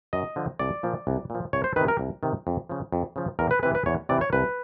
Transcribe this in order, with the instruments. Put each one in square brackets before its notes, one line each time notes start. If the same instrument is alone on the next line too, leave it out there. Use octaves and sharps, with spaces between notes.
[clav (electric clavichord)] F#2 D#5
D3 F3
C2 D5
A#2 F3
C2
A#2 F3
C2 C#5
C5
D#3 B4
C3
A#4
C2
C3 D#3
F2
C#3 F3
F2
C#3 F3
E2 A#4
B4
C3 E3 B4
B4
E2 C#5
C3 E3 D5
C#5
C2 B4